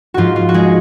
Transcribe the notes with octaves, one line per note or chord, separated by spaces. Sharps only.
G#2 F3 F4 F#4
F4
F#4
G#3 G#4